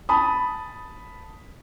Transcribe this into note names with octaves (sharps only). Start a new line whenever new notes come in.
A5 B5 D#6